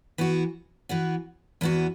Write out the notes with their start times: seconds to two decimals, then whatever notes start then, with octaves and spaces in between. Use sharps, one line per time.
0.18 E3 B3 F#4
0.89 E3 B3 F#4
1.61 E2 E3 B3 F#4